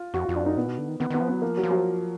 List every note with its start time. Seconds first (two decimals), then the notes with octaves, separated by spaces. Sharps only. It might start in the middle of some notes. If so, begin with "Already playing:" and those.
Already playing: F4
0.14 F2 F#4
0.25 F2 F4
0.36 D4
0.43 F#2 D#4
0.57 A#2 B3
0.68 B2
0.78 D3
0.88 D#3
1.00 D#3 B3
1.10 D#3 B3
1.21 F3
1.28 F#3 B3
1.42 F3 A#3
1.57 F#3
1.63 F3
1.71 F#3